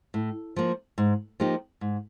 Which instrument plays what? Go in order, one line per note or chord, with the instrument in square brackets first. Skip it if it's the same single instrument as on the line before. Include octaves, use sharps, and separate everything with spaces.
[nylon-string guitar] A2
F3 A#3
G#2
F3 A#3 D#4 G4
G#2